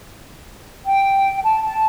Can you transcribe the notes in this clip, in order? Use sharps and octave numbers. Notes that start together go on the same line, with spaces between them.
G5
A5
A5